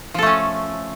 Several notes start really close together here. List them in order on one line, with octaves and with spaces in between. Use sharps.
F3 A4 A3 C#4